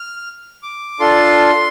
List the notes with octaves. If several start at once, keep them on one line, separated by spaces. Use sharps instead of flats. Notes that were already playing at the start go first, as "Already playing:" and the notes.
Already playing: F6
D6
D4 F4 A4 C6